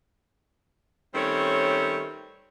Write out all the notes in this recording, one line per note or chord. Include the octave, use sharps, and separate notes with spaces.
D#3 G3 A3 C4 C#4 C#5